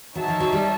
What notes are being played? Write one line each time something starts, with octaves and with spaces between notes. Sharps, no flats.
F#3 D#4 G#4 C#5 E5 A5
F3
F#3
G3